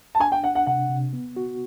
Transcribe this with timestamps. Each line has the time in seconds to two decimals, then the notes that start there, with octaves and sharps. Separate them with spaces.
0.15 A5
0.20 D4 G#5
0.32 G5
0.43 D4 F#5
0.55 F#5
0.66 C3 F#5
0.89 C3
1.13 B3
1.36 F#4